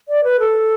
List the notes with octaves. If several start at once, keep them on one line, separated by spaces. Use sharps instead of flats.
D5
B4
A4